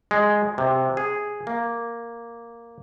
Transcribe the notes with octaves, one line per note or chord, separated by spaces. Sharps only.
G#3
C3
G#4
A#3